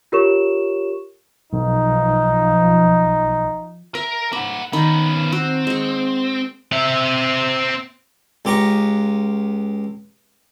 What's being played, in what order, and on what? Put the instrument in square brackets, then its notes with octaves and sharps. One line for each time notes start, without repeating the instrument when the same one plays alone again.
[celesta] F4 G4 A#4 C#5 C#6 E7
[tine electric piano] B1 [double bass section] F3 [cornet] D#4
[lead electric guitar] A#4 [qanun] E5
[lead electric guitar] A#3 F#5 [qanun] B5
[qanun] D#3 B5 [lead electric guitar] B3 C#4
[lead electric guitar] C4 [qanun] F#4
[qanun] G#3 C#6
[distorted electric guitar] C4 E5
[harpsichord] C#2 G4 A#5 C#6